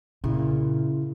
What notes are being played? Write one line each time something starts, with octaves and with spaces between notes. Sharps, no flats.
A#2 C#3 E4